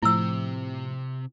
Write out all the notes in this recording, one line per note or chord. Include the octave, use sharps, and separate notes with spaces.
A2 C3 F3 C4 E4 E6